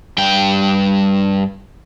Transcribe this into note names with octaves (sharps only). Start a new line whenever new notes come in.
G2 G5